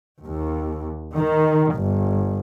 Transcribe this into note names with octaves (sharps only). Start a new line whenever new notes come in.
D#2
D#3
G1